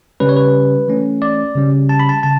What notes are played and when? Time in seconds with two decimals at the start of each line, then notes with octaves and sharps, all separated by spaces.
0.20 C#3 G3 C#4 B4
0.29 C#5
0.36 B4
0.88 E3 A3 C#4
1.22 D5
1.55 C#3 G3 C#4
1.89 A5
2.00 B5
2.09 A5
2.23 C#3 A5